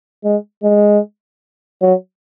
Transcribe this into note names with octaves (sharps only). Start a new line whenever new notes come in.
G#3
G#3
F#3